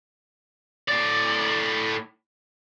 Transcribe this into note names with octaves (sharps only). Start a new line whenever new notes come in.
A2 D5